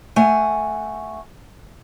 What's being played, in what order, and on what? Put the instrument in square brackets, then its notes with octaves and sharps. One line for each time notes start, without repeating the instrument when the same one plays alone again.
[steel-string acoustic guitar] A3 F#5 G#5